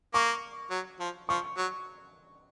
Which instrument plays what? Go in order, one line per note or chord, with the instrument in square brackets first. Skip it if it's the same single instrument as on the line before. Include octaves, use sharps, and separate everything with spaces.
[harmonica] A#3 [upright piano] C#6
[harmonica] F#3
F3
[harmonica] F3 [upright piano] C#6
[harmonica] F#3